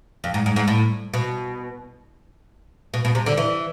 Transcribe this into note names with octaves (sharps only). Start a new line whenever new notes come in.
F2
G#2
G#2
G#2
A2
B2
B2
B2
C3
D3
E3